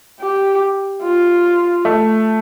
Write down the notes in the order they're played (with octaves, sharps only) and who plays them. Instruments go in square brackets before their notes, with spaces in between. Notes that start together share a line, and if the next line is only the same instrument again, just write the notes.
[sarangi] G4
F4
[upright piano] A3